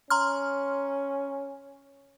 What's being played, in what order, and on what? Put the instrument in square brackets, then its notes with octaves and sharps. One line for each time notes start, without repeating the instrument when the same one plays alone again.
[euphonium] C#4 [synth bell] A#5 C6 F6